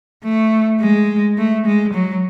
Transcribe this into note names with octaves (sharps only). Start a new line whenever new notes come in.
A3
G#3
A3
G#3
F#3